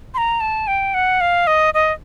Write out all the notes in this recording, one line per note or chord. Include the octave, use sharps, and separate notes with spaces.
C6
A#5
A5
G5
F#5
F5
D#5
D#5